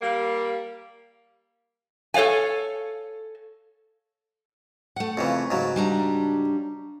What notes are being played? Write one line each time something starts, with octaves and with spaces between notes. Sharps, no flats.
G3 A#3
A4 C#5 D5 F5 G#5
A3 F#5
F2 C#3 E3
G#2 C#3 F#3
G3 D4 A#5